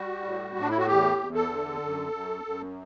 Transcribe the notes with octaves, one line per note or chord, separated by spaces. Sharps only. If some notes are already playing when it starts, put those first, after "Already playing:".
Already playing: G3 F#4
A2
A2 D4
E4
F#4
E2 G4
E2
A4
D3
F#2
F#2
F#2